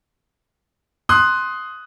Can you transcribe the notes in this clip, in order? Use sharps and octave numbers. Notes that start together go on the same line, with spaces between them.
C6 D#6 F#6